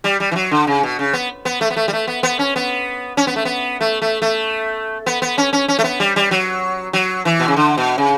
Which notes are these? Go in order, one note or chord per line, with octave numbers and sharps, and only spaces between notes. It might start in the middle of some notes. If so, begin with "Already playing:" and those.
G3
G3
E3
F#3
D3
C#3
B2
C#3
B3
B3
A3
B3
A3
G3
A3
B3
B3
C#4
B3
C#4
B3
A3
B3
A3
A3
A3
B3
B3
C#4
C#4
C#4
A3
B3
G3
G3
F#3
F#3
E3
B2
C#3
D3
B2
C#3